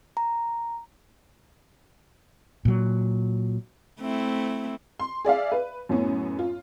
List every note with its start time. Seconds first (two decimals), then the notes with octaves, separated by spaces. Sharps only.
0.17 A#5
2.65 A#2 F#3
4.01 A3 C4 E4
5.00 C6
5.25 G#4 D5 E5 F5
5.52 B4
5.89 F#2 A2 B3 C#4
6.39 F4